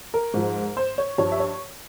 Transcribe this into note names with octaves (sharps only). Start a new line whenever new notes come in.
A#4
G#2 F3
C5
C#5
G2 F3 C#5
E5
C#5